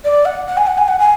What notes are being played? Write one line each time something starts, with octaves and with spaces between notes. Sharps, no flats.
D5
F#5
F#5
G#5
F#5
G#5
F#5
G#5